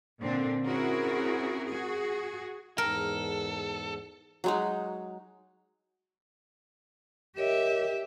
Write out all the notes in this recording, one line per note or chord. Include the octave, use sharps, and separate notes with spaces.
A#2 D3 C4 D4
C4 C#4 E4 F#4 G#4 A#4
F#4 G#4
E2 G#2 A4 A#4
F#3 G#3 D#4
G4 A#4 C#5 D#5 E5